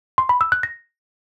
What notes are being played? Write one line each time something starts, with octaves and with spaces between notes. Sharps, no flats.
C6
B5
E6
F#6
A#6